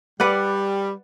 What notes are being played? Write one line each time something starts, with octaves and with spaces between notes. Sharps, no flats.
G3 B4 D5 F#5